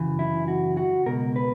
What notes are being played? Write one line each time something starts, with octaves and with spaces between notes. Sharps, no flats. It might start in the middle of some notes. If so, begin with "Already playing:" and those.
Already playing: F#2 C#3 E3
E4
F#4
F#4
C#2 B2 A#4
B4